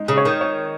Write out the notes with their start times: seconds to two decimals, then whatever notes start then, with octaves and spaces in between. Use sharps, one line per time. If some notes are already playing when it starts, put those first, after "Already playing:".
Already playing: G#3 D#4
0.08 C#3
0.17 C#5
0.25 D#3
0.41 C#5